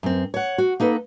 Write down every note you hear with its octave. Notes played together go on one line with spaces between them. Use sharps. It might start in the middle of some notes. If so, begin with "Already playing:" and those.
F#2 C4
C#5 F#5
F#4
A#3 D#4 A4 B4